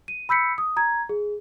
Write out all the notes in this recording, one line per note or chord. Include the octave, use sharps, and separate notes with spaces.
D#7
B5 E6 G6 B6 C#7
D#6
A#5 G#6
G#4